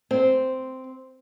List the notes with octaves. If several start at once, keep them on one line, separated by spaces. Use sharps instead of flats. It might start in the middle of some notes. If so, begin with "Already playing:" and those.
C4